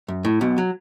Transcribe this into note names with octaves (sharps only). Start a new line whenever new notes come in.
F#2
A2
B1 B2
F#3